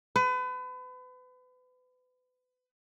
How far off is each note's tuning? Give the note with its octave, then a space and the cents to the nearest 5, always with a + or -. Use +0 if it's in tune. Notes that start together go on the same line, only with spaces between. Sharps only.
B4 +35